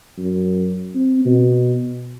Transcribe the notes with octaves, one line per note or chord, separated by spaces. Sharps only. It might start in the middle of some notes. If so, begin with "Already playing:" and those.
F#2
C4
B2